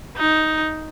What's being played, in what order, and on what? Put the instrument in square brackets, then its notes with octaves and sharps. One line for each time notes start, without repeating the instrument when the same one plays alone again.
[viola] D#4